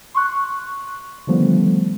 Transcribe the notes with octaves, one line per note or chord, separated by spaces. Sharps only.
C6 C#6 F#6
D3 D#3 F3 G3 A3 B3